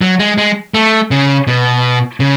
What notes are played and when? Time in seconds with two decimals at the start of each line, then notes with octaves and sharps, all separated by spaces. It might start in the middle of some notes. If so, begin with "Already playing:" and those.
0.01 F#3
0.19 G#3
0.38 G#3
0.74 A3
1.11 C#3
1.47 B2
2.20 C#3